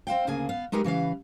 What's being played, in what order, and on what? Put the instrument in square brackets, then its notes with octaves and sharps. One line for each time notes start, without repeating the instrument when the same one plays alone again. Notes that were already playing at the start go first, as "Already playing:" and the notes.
[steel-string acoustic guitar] C4 C5 F5 G5
D2 C#3 A#3 G#4 G#5
B3 F5
G#3 D#4 G4 G#4 A#4 B4
C#3 E3 B4 F5